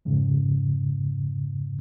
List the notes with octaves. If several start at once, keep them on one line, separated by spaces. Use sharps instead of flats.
F2 G#2 C#3